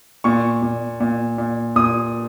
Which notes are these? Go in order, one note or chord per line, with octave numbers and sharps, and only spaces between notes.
A#2 C#6
A#2
A#2
A#2
A#2 D#6